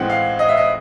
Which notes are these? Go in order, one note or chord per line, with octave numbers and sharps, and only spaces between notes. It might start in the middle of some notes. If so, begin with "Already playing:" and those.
Already playing: A2 E3 G#3 C4 F#5 G5
F5
D#5
E5
D#5